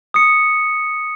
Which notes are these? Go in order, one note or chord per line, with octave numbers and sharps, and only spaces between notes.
D#6 C#7